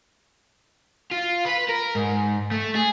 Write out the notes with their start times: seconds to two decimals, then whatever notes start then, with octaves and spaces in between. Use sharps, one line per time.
1.12 F4
1.46 B4
1.69 A#4
1.95 G#2
2.51 A3
2.75 G#4